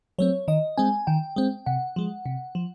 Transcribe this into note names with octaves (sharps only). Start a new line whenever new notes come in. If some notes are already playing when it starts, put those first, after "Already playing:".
F#3 A3 C4 C#5
D#3 D#5
G#3 C4 G#5
D#3 G5
G#3 C4
C3 F#5
F3 G#3
C3
F3